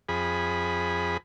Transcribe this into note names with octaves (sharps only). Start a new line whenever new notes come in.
F2 G#4 B5